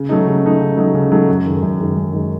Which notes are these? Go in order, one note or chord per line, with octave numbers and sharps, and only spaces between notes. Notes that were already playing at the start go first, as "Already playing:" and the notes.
Already playing: C#3
F#3 A3 D#4
C#3
F#3 A3 D#4
C#3
F#3 A3 D#4
C#3
F#3 A3 D#4
F#2
D#3 G#3
F#2
D#3 G#3
F#2
D#3 G#3